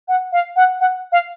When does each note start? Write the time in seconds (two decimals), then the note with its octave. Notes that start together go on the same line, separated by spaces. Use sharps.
0.08 F#5
0.32 F5
0.56 F#5
0.80 F#5
1.12 F5